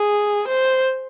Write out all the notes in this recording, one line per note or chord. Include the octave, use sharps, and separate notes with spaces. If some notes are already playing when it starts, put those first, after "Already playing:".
Already playing: G#4
C5